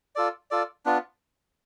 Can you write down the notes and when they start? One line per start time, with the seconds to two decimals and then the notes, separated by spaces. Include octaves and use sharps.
0.15 F4 A4 D5
0.51 F4 A4 D5
0.86 B3 D4 F4